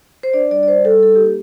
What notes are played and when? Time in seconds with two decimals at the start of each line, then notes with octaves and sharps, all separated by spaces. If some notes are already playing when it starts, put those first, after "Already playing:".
0.23 C5
0.33 D4 D5
0.51 G3 D5
0.63 D5
0.67 G3 C5
0.84 G3 A4
1.02 D#4 A4
1.15 A#3 G4